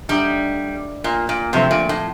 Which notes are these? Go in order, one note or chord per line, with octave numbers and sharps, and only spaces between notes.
D3 G3 A3 D#4 G4
A#2
A#2
C3 F3 A3 C4
A#2
A2